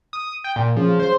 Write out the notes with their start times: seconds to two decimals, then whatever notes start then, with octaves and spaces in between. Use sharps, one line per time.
0.13 D#6
0.44 G5
0.56 A#2
0.76 C#3 F3
1.00 C5